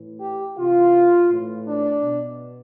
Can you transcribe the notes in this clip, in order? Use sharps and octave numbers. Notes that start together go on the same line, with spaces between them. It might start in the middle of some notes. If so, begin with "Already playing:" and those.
Already playing: A2 E3
G4
C3 E3 F4
A2 E3
D4
B2